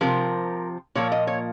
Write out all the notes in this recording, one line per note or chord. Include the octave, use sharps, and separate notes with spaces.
C3 F3 C4 A#4
A#2 F3 A#3 C#5
D#5
C#5